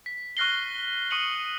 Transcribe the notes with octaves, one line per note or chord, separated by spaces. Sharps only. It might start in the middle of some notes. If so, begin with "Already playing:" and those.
B6
C#6 F6 F#6 A#6 C7 G7
C#6 D#6 C#7 D#7 F#7 G7